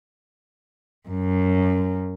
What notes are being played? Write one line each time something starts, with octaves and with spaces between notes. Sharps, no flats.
F#2